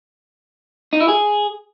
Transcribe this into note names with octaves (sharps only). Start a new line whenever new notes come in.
D#4
E4
G#4